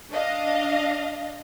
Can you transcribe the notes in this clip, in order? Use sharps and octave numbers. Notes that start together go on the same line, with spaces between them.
D4 D#5 F5